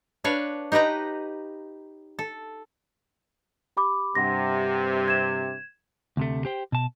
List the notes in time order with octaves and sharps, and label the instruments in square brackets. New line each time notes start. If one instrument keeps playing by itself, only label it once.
[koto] D4 B4 C#5 F5
D#4 G4 B4 D#5 A#5
A4
[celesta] G4 B5 D6
[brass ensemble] G2 C3 [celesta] F#5 C6 A#6
[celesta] G#6 E7
[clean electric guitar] D2 C3 A3
G4 C5 G5
B2 A5